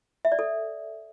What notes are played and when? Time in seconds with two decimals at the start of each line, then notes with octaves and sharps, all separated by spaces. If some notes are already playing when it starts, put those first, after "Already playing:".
0.25 E5
0.32 D5
0.39 A4